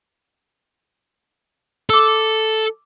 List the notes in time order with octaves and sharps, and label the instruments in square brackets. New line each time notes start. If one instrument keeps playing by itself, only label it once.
[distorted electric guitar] A4 [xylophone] D6 E6